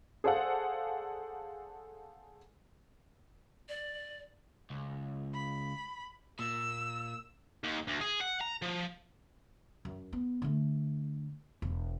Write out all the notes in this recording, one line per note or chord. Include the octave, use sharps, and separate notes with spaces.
G#4 A4 C5 D5 F5 F#5
D5
C#2
B5
A#2 E6
D#2
D2
G#4
F#5
A#5
F3
F#2
B3
D3 A3
E1